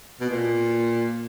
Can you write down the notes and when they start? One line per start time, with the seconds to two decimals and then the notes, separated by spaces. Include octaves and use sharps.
0.20 B2
0.29 A#2